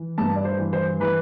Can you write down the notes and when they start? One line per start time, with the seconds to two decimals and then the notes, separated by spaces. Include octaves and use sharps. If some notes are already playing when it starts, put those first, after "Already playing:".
Already playing: E3
0.18 G2 A5
0.35 D5
0.45 C5
0.59 E3
0.73 C5
1.00 E3 B4